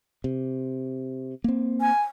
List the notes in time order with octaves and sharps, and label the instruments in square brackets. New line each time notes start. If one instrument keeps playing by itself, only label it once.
[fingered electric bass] C3
A#3 C4
[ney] G#5